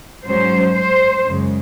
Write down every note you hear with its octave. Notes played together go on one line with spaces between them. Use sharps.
G#2 F#3 C#4 C5
C5
F#2 C#3 G#3